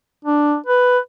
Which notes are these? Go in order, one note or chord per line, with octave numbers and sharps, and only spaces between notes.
D4
B4